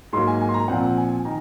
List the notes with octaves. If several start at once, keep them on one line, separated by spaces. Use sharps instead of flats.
G#2 F#3 A#3 C6
G#5
G#5
C6
A#5
A#2 F3 C4 F#5
G#5
D#3 A#5